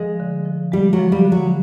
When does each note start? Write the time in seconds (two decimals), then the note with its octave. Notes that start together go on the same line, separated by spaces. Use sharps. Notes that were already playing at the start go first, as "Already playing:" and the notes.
Already playing: F3 G#3
0.20 D3
0.46 F3
0.72 G3 G#3
0.93 F#3
0.99 F3
1.12 G3
1.25 D3
1.32 F#3